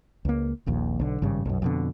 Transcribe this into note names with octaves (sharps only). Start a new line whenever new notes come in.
C#2 A#3
D#1 A#1 D#2
B1 D3
G#1 G2 C#3 G3
B1 F#2
F2 B2 D3